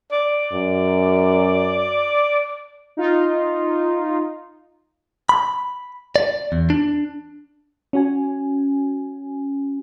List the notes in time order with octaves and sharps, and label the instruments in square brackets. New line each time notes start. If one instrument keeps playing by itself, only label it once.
[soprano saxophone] D5
[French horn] F#2
[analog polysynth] D#4 F4
[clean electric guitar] B5
D5
E2
D4
[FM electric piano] C#4 F#4 G#5